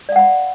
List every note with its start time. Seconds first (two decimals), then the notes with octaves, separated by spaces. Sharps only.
0.09 D5
0.12 F5
0.16 F#5
0.19 B5